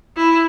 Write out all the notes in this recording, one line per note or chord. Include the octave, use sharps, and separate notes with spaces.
E4